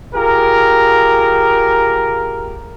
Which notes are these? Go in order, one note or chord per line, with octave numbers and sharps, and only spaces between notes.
F4 G4 G#4 A#4